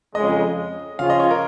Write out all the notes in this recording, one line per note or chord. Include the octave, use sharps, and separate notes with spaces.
F2 C#3 G#3 D#5
C#3 F3 C#4 F4 F5
D#5
C#5
A#4